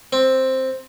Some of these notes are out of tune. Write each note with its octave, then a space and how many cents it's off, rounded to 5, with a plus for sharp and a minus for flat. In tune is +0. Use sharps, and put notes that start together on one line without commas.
C4 +5